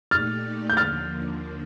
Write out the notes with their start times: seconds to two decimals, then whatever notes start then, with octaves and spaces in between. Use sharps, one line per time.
0.11 A#2 A3 D#4 G4 D5 F6 A6
0.70 G6
0.77 D#2 D3 F3 A#3 F6 A6